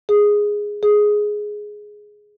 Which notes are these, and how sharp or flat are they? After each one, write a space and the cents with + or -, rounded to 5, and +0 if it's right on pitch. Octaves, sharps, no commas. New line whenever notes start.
G#4 -5
G#4 +5